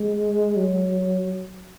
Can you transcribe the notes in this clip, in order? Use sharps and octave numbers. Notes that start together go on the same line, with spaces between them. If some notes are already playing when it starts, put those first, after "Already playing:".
Already playing: G#3
F#3